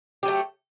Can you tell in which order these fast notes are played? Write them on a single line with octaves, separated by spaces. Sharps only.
G4 F#3 A3